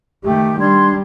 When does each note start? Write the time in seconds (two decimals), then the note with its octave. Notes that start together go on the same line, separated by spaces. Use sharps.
0.24 D#3 A3 G4
0.59 G3 D4 C6 G#6